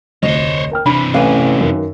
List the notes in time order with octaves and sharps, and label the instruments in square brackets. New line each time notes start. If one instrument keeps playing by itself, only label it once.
[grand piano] F1 D2 [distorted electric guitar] C5 C#5 [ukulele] D#5
[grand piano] A#4 G5 F6
[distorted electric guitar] C3 E3 [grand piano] D4 [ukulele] B5
[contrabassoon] A1 [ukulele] B4 F5 G#5
[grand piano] F#2 D#3